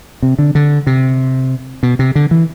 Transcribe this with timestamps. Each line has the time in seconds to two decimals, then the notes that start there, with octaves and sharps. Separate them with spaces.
0.23 C3
0.39 D3
0.55 D3
0.87 C3
1.83 B2
1.99 C3
2.15 D3
2.31 E3